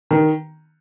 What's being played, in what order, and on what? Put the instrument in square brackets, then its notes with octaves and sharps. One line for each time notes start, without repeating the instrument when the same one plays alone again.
[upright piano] D#3